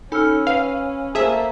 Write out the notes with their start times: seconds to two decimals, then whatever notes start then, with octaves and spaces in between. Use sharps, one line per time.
0.12 C#4 D#4 A4 G#5 B5 E6 F6
0.47 B4 F5
1.15 A3 A#3 G#4 C5 E5 A5